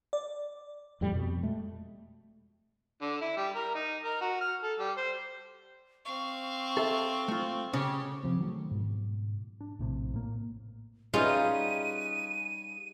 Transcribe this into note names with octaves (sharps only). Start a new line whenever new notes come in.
D5
F2 A2 G3
F2 B2
G#3 A3
D3
E4
G3
A#4
D#4
A#4
F#4
F6
A4
G3
C5
C4 F5 C#6
A4 E5
A3 F4
C#3 C#4 G4
C3 F3 C4
D#3 F#3 A3
G#2 B2
D4
A#1 A2 C3
A2 A#3
G3 C#4 D#4 F4 G#4 B4 D#7